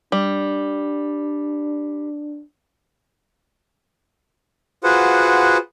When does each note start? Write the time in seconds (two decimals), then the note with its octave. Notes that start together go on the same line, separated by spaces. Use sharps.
0.12 G3 D4
4.84 F4 F#4 G#4 B4 C5 F#5